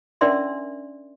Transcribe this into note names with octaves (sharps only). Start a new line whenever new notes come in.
C#4 D4 A#4 D5 E5 C6